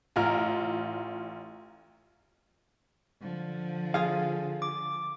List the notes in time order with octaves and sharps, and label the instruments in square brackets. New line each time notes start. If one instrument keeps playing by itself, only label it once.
[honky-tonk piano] A1 F4 A#5 F6
[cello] D3 F3
[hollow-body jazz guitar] F4 G#4 F5
[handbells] D6